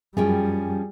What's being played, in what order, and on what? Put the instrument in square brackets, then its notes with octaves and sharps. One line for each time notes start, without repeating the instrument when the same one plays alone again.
[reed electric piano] F#2 [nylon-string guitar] F3 C#4 G5 [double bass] G3 [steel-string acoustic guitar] G#4